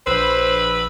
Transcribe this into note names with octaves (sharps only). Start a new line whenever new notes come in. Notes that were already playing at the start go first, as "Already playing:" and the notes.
A#1 B4 C5 B5 E6